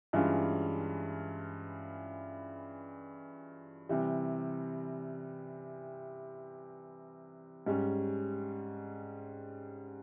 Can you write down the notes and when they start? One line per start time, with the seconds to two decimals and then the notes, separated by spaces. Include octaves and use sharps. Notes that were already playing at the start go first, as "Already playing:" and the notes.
0.13 G2 E3 G#3 C#4 F4
3.89 C3 E3 G3
7.66 G#2 G3 C#4